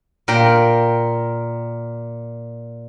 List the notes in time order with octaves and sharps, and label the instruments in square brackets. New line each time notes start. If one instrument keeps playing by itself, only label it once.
[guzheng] A#2 A#4 G5